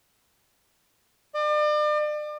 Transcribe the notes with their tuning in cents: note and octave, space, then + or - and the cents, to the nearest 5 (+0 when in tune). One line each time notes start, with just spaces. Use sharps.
D5 +40